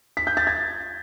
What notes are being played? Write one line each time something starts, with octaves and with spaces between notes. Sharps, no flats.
B6
G6
A6
G#6